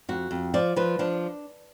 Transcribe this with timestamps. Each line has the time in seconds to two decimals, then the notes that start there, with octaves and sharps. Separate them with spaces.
0.09 F2 F#4
0.31 F2
0.54 F3 D5
0.76 F3 B4
0.99 F3 D4